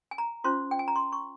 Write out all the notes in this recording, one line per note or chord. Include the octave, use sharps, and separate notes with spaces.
G#5
A#5
C#4 F4 C5 C6
G5
G#5
A#5
C6
C#6